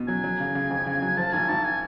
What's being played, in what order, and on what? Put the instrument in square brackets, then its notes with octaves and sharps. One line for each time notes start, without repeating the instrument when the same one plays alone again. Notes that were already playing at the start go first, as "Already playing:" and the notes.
Already playing: [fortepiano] B2
[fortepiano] F#3 [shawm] G#5
[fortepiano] F#3
C#3
C#3
F2
C#3
F#3
[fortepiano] F3 [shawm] A5
[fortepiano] G#1 [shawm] G#5
[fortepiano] G#1 [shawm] A5
[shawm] G#5